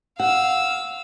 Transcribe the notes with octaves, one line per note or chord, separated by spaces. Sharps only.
F5 F#5 E6